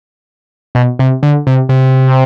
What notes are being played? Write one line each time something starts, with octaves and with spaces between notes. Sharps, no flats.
B2
C3
D3
C3
C3